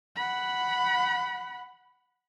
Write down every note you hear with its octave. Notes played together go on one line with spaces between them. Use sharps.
F#5 B5